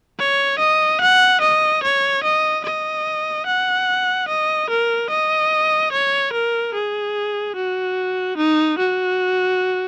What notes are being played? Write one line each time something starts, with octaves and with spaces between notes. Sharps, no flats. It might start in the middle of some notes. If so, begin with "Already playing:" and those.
C#5
D#5
F#5
D#5
C#5
D#5
D#5
F#5
D#5
A#4
D#5
C#5
A#4
G#4
F#4
D#4
F#4